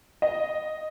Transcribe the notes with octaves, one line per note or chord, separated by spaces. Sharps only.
D#5